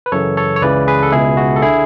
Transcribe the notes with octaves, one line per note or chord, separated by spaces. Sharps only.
B4
F#2 C#3 E3 A4 C#5
A4 C#5
C#5
C#2 C#3 E3 B4 D5
G#4 B4
A4
C#2 B2 E4 G#4
F#4
A4
D3 E4 G#4